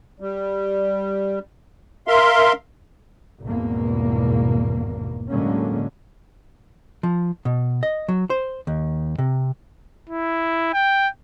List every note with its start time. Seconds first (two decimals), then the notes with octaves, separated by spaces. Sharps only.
0.20 G3
2.08 A#4 E5 F5 C6
3.43 G#1 E2 G2 B2 A#3
5.29 A2 D3 F#3 G#3 A#3 C#4
7.03 F3
7.45 B2
7.83 D#5
8.08 F#3
8.30 C5
8.67 D#2
9.18 C3
10.09 E4
10.74 G5